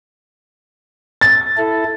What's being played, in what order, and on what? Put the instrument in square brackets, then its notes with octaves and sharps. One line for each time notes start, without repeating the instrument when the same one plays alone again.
[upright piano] A6
[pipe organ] E4 A4